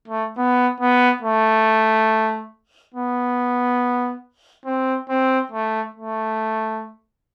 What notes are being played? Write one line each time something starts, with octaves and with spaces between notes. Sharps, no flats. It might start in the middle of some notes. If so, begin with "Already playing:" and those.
A3
B3
B3
A3
B3
C4
C4
A3
A3